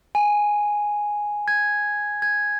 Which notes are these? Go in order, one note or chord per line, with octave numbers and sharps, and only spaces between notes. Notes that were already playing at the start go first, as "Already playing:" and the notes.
G#5
G#6
G#6